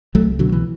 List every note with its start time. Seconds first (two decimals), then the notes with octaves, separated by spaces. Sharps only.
0.15 C2 F#3 A3
0.39 B2 D3 F#3
0.52 E3